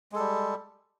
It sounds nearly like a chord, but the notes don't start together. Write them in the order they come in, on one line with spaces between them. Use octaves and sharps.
G#3 A4 G3